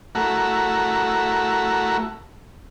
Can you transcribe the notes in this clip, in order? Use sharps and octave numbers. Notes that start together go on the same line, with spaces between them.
A3 E4 F#4 A#4